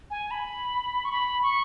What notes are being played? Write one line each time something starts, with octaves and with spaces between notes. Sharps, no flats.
G#5
B5
C#6
B5
C#6